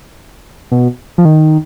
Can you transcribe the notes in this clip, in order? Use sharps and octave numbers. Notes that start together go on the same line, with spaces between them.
B2
F3
D#3